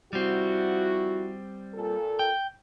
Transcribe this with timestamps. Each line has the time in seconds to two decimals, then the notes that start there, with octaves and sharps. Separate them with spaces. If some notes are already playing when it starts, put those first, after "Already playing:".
0.13 F3 G3 C4 E4 F#4
1.74 A#2 A4
2.19 G5